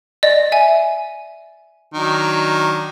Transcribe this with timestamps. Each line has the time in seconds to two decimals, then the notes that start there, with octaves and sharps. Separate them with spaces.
0.23 D5 D#5
0.52 E5 G#5
1.94 D#3 F#3 D4